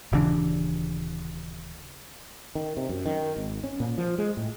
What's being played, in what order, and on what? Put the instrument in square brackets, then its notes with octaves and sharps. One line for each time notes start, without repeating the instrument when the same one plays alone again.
[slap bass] D#1 C#3 E3 D4
[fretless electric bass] D#3
C3
F#2
D#3
G#1
C#4
A#2
F3
G#3
A2